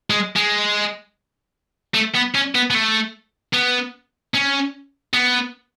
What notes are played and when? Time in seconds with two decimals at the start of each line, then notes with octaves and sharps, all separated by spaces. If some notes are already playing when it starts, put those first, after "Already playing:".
0.10 G#3
0.36 G#3
1.94 A3
2.15 B3
2.35 C#4
2.55 B3
2.70 B3
2.75 A3
3.54 B3
4.34 C#4
5.13 B3